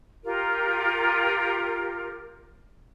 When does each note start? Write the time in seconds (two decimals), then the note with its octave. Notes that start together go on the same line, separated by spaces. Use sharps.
0.23 F4 G4 A#4